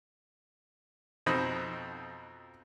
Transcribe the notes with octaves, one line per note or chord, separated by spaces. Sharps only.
F2 B2 C4 D#4 D#5 B5